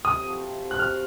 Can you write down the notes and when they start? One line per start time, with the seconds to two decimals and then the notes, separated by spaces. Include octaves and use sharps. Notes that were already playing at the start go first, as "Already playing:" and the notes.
0.05 C3 D#6
0.24 F3 C4 F#4
0.42 C3
0.61 F3 C4 F#4
0.71 F#6
0.79 C3 F6